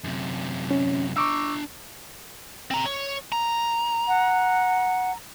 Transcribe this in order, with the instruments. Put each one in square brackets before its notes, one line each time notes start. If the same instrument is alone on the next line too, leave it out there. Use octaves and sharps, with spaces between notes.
[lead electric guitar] F#2 C3
[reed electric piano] C#4
[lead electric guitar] D4 A#5 [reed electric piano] C#6 D6 E6
[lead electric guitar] C4 A#5
C#5
A#5
[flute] F#5